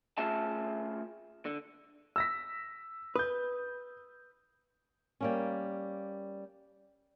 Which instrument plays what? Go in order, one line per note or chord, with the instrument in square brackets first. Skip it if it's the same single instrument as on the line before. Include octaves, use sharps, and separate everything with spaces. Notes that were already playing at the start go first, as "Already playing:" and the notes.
[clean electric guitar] A3 C#4 F4 G#4 E5 A5
D3
[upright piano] E6 A#6 B6
[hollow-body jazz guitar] B4 [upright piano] D#6 G6
[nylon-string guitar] G3 A#3 C#4